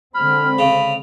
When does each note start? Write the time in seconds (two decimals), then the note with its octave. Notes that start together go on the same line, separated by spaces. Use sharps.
0.15 D3 G#3 C4 B5 F6
0.59 C#3 F7